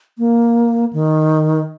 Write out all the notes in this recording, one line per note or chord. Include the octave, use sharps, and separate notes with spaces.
A#3
D#3